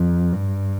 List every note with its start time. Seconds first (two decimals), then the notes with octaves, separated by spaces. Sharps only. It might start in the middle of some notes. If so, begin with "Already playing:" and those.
Already playing: F2
0.33 G2